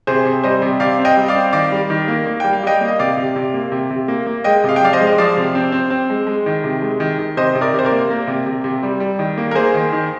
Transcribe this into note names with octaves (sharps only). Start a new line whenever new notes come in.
C3 G#4 C5
C3
G3 C5 D#5
C3
C3 D5 F5
C4
D#5 G5
G3
D5 F5
C4
D#3 D5 F5
G3
D#3
A#3
A#3
G3 G5
F5
G3 D#5 G5
A#3
D#5
C3 D5 F5
C3
C3
A#3
C3
C3
A#3
A#3
G#3 D#5 G5
C3
F5
G5
F3 D5 F5
C5 D#5
G#3
D#5
F3 D5 F5
C3
C4
C4
C4
G#3
G#3
D#3
C3
G#3
D#3
D#3
C3 C5 D#5
C3
A#4 D5
C3 C5
A#4 D5
A#3
A#3
C3
C3
C3
G3
G3
D#3
A#3
A#4
A#3 G#4 C5
D#3
D#3